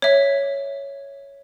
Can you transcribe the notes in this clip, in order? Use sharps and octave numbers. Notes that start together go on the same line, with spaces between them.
C#5 E5